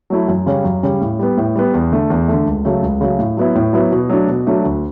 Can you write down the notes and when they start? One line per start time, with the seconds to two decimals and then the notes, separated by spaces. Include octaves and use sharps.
0.10 F#3 A3 E4
0.28 F#2
0.46 C#3 G3 C#4
0.64 F#2
0.83 C#3 G3 C#4
1.01 A2
1.19 G3 B3
1.37 A2
1.55 G3 B3
1.74 E2
1.92 D3 A3
2.10 E2
2.28 D3 A3
2.46 C#2
2.65 C#3 F#3 A3
2.82 C#2
3.01 C#3 F#3 A3
3.19 A2
3.37 F#3 B3 E4
3.55 A2
3.73 F#3 B3 E4
3.92 B2
4.09 F#3 A3 D4
4.28 B2
4.47 F#3 A3 D4
4.64 D2